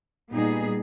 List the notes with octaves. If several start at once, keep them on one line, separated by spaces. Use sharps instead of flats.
A#2 G3 B3 D#4 G#4